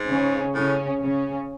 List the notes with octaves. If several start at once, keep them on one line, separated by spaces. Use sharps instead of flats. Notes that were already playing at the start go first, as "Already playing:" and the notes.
Already playing: G#2
C#3 C#4
A2 C#3 C#4
C#3 C#4